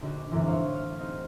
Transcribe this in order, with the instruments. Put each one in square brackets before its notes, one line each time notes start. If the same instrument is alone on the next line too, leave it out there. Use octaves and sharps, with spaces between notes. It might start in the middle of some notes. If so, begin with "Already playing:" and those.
[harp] A#1 D3 D#4 F#4 D5
G1 C2 F#2 A2 D3 E3
E4 C5 C#5 F5 F#5
F6
C4 D#4 G4